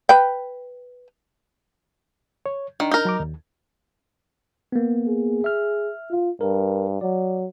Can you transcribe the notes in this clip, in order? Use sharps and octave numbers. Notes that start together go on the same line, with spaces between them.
B4 G5
C#5
D#3 D4
D#4 A#4
F#3 A#5 D6
D#2
A#3 B3
G#4
E5 F6
F4
G2 A#4
F#3 D5